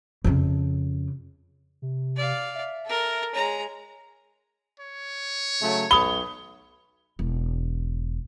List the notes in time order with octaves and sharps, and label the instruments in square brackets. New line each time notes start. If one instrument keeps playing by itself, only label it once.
[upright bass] F2 C#3
[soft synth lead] C3
[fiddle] D5 F5
[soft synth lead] E5
[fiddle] A4 A#4
[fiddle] G#3 A#5 [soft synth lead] C#5
[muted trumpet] C#5
[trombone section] C#3 F#3 A3
[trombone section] B1 [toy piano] B5 D#6 [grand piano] G7
[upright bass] E1